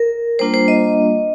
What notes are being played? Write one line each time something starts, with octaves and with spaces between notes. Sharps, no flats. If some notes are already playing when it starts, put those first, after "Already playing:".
Already playing: A#4
G3 A#3 D4 F4 C5
C5
D#5